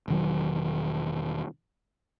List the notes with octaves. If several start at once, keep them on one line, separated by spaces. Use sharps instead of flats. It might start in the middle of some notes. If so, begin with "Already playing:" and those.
E1 D#3 F#3